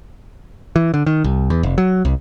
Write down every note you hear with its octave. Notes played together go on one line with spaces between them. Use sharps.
E3
D3
D#3
C2
E2
F1
F#3
C2